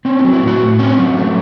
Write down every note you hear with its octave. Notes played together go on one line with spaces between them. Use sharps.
C4 C#4
E4
F#3
E4
A2 F#4
A2
C4 C#4
F#3 C#4
A3